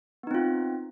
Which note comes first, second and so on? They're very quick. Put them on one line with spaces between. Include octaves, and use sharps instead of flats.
B3 D#4 C4 F4